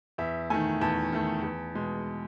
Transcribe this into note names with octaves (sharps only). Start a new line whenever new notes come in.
E2 E5
D#3 A3 G#5
E2 A5
D#3 A3
E2
B2 G#3